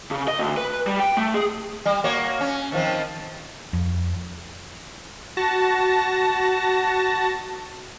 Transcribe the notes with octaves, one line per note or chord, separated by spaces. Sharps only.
C#3
D#5
D2
B4
G3
G5
A3
G#4
G3
A#3 F#4 C#5
C#4
D#3 F3 C4
F2
F#4 A5 A#6